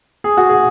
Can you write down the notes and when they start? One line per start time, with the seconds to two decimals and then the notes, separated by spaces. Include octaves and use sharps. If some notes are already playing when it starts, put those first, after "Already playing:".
0.24 G#4
0.37 F#4
0.50 G#4